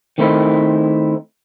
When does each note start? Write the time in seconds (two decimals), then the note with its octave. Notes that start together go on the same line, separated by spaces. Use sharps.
0.18 D#3 A3 C4 D#4 E4